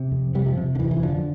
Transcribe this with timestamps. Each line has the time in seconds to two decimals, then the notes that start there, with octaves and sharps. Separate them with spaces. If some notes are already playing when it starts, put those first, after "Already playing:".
Already playing: C3
0.11 F2
0.35 C3 G3
0.46 F3
0.57 C3
0.75 D3
0.79 F2 E3
0.91 E3
1.03 D3 F3